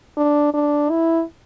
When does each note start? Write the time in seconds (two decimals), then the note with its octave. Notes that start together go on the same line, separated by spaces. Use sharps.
0.17 D4
0.54 D4
0.90 E4